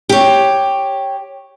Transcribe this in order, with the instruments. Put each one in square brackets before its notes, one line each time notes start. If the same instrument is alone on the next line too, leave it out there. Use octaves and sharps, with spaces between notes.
[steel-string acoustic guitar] G4 C#5